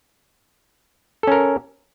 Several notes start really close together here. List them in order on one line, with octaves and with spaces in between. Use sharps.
A4 C#4 A#4